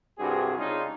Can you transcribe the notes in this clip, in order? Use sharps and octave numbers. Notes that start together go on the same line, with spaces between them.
C2 G2 C4 F#4 G#4
C#3 G#3 D4 D#4 F4